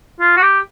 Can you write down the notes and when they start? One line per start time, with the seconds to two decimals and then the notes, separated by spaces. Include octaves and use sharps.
0.20 F4
0.37 F#4
0.42 G4